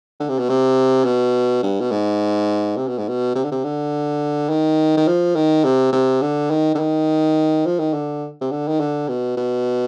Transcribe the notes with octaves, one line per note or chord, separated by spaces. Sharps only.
D3
C3
B2
C3
B2
G2
B2
G#2
C3
B2
G#2
B2
C3
D3
C3
D3
D#3
D#3
F3
D#3
C3
C3
D3
D#3
D3
D#3
F3
D#3
D3
C3
D3
D#3
D3
B2
B2